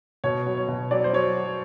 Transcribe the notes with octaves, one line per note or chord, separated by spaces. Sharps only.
B2 C#5
F#3
C#5
B2
F#3 D5
C5
F#3 C#5